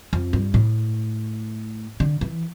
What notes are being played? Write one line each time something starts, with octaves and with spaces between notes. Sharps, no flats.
F2
G2
A2
D3
E3